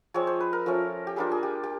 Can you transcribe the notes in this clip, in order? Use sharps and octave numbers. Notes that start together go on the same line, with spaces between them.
F3 G#3 C4 C#5
C5
B4
A#4
F3 A3 C#4
G4
G3 A#3 D4 F4 G#4
G#4
G4
G4